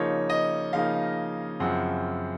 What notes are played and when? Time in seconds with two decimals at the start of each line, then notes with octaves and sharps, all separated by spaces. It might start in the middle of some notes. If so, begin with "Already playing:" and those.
Already playing: C#3 F3 A#3 D#4 C#5
0.30 D#5
0.73 C#3 F3 A#3 D#4 F5
1.60 F#2 C#3 F3 C4 F#5